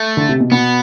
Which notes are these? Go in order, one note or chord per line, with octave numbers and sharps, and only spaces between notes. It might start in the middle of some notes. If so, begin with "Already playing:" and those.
Already playing: A3
D3
C3
B2
B2 B3